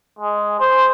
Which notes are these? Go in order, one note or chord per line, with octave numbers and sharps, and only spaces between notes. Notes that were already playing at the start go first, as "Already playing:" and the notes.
G#3
C5